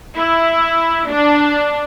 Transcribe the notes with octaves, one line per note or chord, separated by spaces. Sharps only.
E4
D4